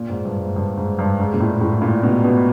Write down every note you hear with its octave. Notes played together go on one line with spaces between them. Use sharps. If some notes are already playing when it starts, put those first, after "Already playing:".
Already playing: A#2
G#2
G2
G#2
G2
G#2
G2
G#2
A#2
A2
A2
A#2
B2
B2